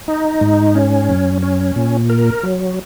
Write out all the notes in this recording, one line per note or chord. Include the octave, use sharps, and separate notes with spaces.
D#4
G#2
C#4
F#2
C#4
A#2
A#4
F#3